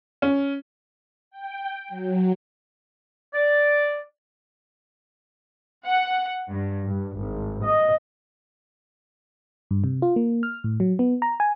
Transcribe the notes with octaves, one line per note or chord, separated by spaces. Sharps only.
C#4
G5
F#3
D5
F#5
G2
G2
G#1
D#5
G2
C3
F4
A#3
F6
A2
F#3
B3
A#5
G#5